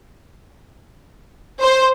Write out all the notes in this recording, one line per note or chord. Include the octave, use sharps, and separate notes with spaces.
C5